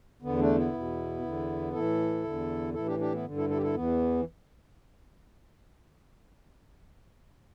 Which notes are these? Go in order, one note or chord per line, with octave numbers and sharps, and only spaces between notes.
E2 D3 B3
A3 D4
B3 E4
E2 B2
E2 D3
A2 E3 E4 A4
E2 D3
A2 E3 E4 A4
D4 G4
D4 G4
B3 E4
G2 D3
E4 A4
E4 A4
G4
E4 A4
E2 E3 B3